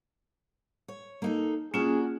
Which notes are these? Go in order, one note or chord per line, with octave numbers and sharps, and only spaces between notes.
C#5
A#3 D#4 A4
A#3 C#4 D4 F4 F#4 G#4